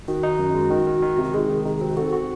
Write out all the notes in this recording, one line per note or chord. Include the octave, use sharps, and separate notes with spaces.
D#3 F#4
D#4
F#2
G#3
D#3
D#3
D#3
C3
F#4
G#3 G#4
D#3
D#4 G#4
G#4
C4 F#4
F#4 A4
F#4